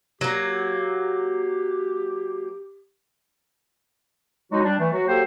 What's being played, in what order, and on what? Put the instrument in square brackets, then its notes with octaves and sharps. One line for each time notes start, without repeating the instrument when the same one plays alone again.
[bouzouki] F#3 A#3 [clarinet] G4
[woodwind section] F#3 G#3 D#4 F#4
G3 D4
E3 A3
F#3 F#4
F#3 A#3 F#4 G4 A4 C5